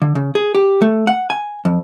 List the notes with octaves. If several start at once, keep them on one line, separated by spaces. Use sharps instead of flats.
D3
C#3
G#4
G4
A3
F#5
G#5
F2